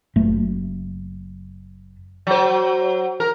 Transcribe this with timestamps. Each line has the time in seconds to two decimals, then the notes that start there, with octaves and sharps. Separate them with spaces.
0.16 F#1 A3
2.27 F#3 C5
3.20 A#4